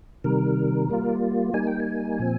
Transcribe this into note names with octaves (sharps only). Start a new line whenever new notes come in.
C3 D#3 G3 A#4
G3 A#3 F4
G3 A#3 D#4 G#5
G5
G#5
A#2 F3 C4